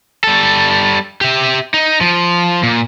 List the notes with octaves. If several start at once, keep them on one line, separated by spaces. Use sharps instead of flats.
G3 A4
G4 E5
D#4
F3
A#2